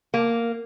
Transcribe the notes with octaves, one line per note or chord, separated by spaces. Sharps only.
A#3